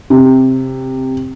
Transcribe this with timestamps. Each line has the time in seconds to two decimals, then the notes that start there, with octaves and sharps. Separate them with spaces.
0.10 C3